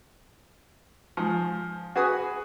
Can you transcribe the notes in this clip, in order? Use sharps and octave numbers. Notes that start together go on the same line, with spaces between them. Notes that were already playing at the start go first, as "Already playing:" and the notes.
G#2 F3
F#4 G#4 B4 G#5 D#6